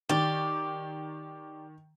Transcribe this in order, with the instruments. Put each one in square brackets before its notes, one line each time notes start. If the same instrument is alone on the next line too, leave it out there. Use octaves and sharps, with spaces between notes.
[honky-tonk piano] D#3 [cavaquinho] G4 D5